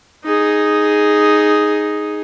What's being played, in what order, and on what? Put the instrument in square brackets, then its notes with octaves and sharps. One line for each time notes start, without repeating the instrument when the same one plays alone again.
[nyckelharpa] D#4 G#4